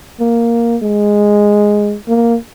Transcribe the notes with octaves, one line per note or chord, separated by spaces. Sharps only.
A#3
G#3
A#3